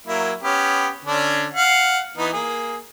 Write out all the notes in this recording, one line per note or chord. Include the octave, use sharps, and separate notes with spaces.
F#3 A#3 E4
B3 C#4 G4
D3 C#4 D4
F5 F#5
E3 B3 D#4
A#3 G#4